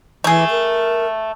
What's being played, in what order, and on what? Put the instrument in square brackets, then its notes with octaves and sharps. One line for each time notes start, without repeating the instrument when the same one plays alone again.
[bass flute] E3 [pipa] A3 G#4
[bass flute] A#4